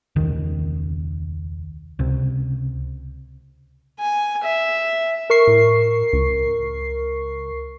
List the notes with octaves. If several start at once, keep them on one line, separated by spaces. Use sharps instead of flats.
E1 C#2 D#3
C#2 C3
G#5
E5
A#4 C#6 C7
A2
C#2